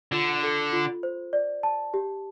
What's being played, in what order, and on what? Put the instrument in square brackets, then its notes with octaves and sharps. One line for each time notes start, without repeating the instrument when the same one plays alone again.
[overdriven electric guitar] D3 [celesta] F4
[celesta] A4
F4
C5
D5
A5
G4